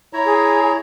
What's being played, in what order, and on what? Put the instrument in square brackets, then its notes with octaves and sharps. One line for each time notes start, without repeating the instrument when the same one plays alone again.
[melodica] E4 C#5 A#5
[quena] G#4